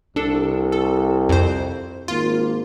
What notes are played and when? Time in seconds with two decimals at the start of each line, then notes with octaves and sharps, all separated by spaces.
0.16 C2 D4 A4
0.72 A4
1.29 F2 C5
2.08 G#1 A#3 F4